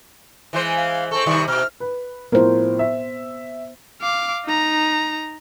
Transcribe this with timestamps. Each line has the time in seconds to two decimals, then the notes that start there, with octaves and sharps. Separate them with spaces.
0.53 E3 G#3 C5
0.76 F5
1.11 C4 A4 C#6
1.26 C3 D#3 G3
1.48 B2 F6
1.80 B4
2.32 A2 F3 B3 A#4 C5
2.79 E5
4.01 F5 D6
4.45 D#4 A#5